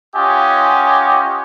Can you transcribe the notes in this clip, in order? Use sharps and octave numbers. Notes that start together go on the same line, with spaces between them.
C#4 F4 G4 D#5 F#5 G#5